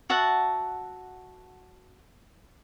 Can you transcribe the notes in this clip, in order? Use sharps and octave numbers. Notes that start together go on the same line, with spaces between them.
F#4 E5 F#5 A5